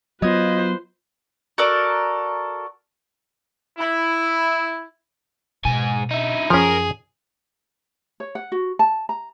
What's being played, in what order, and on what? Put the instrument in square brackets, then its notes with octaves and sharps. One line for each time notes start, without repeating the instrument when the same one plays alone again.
[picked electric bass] F#3 B3 [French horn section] F4 [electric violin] B4 C5 [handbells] D#5 D#6 G#6
[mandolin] F#4 A4 A#4 D5
[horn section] E4
[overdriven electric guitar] G#2 G#5 [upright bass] B2
[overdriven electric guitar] D#4 E4
[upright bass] F#2 [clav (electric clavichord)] F3 C#4 [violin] G#4 [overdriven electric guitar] A#4
[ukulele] C#5
F#5
F#4
A5
A#5